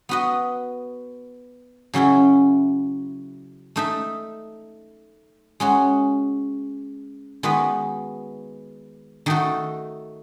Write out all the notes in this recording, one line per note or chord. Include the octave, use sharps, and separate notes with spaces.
B3 F#4 B4 D#5
C#3 F#3 C#4 E4
A3 D#4 A4 E5
G#3 C#4 F#4
D#3 G#3 B3 F#4 B4
D#3 A3 D#4 F#4 A4